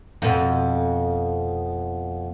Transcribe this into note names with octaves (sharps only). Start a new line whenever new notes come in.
F2 B2